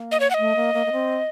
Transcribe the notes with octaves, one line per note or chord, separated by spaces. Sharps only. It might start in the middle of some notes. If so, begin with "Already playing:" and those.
Already playing: A#3
D#5
C#5
F#5
A3 D#5
A#3
A#3
A#3
C4